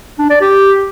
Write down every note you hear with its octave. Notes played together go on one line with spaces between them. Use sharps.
D4
D5
G4